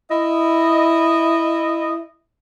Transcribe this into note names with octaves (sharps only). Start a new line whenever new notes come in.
E4 D#5